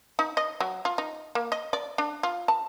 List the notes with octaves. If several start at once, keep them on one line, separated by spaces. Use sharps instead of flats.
D#4
D#5
F#3
F4
D#4
A#3
D#5
D5
D4
F4
A5